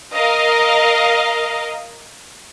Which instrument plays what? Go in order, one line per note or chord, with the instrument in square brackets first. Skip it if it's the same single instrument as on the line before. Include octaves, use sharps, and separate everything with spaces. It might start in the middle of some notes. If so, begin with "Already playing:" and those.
[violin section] A#4 D#5 F5